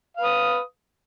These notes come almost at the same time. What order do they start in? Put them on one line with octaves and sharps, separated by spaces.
F5 B4 D#6